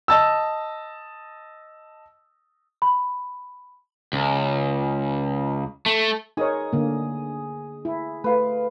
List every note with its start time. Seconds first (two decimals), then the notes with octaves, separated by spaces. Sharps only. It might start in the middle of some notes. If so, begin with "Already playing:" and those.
0.08 D#5 A5 E6
2.82 B5
4.13 C#2
5.86 A3
6.37 D#4 G#4 A#4 C#5 D#5
6.73 D3 A#3
7.85 E4
8.24 A3 B4 F5